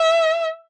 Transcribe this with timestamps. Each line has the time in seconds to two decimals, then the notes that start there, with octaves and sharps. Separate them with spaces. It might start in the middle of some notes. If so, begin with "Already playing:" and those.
Already playing: E5